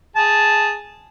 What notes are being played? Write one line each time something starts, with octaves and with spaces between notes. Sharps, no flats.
G#4 A5